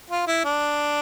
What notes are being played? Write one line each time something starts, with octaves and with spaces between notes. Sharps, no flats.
F4
E4
D4